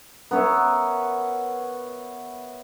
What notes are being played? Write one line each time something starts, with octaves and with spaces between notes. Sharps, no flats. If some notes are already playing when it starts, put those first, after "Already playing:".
B3 A#4 C#5 E5